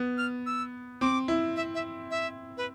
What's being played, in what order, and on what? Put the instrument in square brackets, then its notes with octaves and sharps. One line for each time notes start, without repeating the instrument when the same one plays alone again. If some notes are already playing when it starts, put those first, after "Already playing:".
Already playing: [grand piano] B3
[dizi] F6
E6
[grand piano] C4 [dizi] D6
[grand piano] E4
[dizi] E5
E5
E5
B4